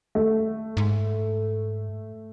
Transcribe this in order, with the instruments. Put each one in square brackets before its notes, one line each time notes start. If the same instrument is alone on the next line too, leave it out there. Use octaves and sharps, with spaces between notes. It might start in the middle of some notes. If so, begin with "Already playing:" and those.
[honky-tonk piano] A3
[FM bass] G#2